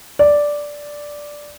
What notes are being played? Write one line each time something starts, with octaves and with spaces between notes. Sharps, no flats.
D5